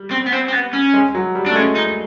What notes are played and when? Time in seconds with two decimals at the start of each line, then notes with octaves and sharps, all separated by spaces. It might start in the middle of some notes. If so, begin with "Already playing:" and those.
Already playing: G3
0.11 C4
0.27 B3
0.33 C4
0.48 C4
0.53 B3
0.73 C#4
0.94 G#3
1.15 F#3
1.35 G3
1.47 A3 D4
1.56 G#3 C#4
1.76 D#4